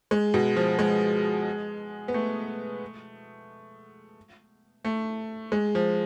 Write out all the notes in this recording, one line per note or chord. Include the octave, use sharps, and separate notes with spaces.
G#3
B2
F3
G#3
B3
A3
A3
G#3
F3